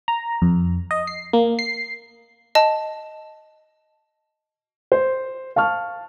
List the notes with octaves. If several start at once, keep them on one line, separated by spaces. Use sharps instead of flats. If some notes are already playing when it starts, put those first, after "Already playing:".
A#5
F2
D#5
C7
A#3
C7
D#5 A5
C5
F5 A5 C#6 F6